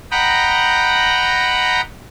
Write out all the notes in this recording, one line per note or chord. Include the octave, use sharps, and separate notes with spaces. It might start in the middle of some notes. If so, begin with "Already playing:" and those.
D#5 F#5 G5 A#5 B5